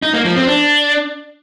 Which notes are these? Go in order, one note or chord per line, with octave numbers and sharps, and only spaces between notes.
D#4
A#3
F3
C4
D4